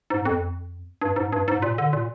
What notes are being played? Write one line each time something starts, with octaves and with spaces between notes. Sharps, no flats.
G#2
F2
G2
G#2
G2
G#2
A#2
D3
A#2